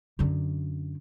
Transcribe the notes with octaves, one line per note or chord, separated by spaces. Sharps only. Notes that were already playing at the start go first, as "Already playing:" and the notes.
F#2 D3